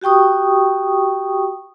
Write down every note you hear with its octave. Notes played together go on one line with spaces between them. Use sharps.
F#4 G4 G5 C#6 D#6